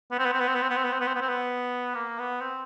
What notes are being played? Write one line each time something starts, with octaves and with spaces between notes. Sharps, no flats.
B3
C4
B3
C4
B3
C4
B3
C4
B3
C4
B3
C4
B3
C4
B3
C4
B3
A#3
B3
C4